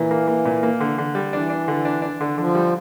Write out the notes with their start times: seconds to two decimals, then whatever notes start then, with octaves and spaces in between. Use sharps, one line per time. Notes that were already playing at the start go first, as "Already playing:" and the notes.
Already playing: A#2 E3
0.11 A#3
0.28 A#3
0.45 A#2
0.63 A#3
0.80 D3
0.98 D3
1.15 G3
1.33 E3 D4
1.50 D4
1.68 D3
1.85 D4
2.02 D4
2.21 D3
2.37 D3 F3
2.55 G3